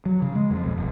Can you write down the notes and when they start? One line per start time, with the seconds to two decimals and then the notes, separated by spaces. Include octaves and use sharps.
0.06 F#3
0.22 C#3
0.35 G#3
0.50 F2
0.65 B1
0.77 E1